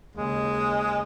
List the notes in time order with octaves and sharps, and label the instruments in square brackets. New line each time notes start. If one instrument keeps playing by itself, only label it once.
[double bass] D#2 C#3 [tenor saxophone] G#3